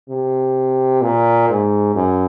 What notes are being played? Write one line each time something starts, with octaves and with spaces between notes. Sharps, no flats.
C3
A#2
G#2
F#2